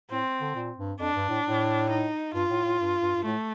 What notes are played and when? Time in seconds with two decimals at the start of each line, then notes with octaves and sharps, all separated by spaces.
0.10 A2 C4
0.40 D3
0.55 A#2
0.78 G2
0.99 F2 D4
1.15 G2
1.29 A2
1.45 A2
1.90 D#4
2.34 G2 F4
2.50 A2
2.65 A2
2.80 G2
3.02 G2
3.16 G2
3.24 A2 A3